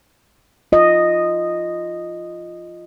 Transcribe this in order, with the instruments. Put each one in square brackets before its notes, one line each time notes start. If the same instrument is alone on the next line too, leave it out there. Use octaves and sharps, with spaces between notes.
[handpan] F4 D#5